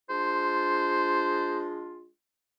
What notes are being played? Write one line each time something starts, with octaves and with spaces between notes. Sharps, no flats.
G#3 D4 F4 C5